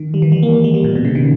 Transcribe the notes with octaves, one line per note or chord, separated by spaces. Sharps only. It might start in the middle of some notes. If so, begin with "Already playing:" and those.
Already playing: D#3
G3
E3
G3
A#3
G#3
G3
A#2
B2
C#3
D#3